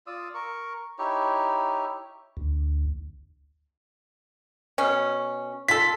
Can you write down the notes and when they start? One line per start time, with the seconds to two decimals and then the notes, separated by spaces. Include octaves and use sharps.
0.07 F4 D5 D#6 E6
0.34 A#4 C#6
0.99 D#4 E4 G4 C#5
2.37 D2
4.78 B2 C#4
5.68 F4 A4 B6